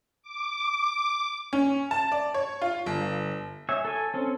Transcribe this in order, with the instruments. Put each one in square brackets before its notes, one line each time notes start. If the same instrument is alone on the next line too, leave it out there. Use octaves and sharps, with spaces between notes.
[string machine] D6
[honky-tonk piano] C#4
A5
D5
C#5
F4
G1
[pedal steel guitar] C#5 E5 G#5
A4 G#5
C4 C#4 A4